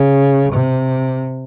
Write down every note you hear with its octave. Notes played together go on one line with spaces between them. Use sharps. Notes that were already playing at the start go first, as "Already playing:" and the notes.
Already playing: C#3
C3